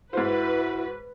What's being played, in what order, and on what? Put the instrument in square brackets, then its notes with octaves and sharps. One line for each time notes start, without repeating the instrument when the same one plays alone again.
[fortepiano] G#2 C5 [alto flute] E4 [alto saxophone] F#4 [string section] B4